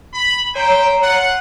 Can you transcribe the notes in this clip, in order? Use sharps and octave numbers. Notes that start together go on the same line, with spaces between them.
B5
G4 C5 C#5 G5 A#5
F4 F#5